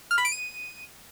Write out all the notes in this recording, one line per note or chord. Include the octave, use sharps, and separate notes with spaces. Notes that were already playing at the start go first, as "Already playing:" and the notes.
F6
B5
D7
D#7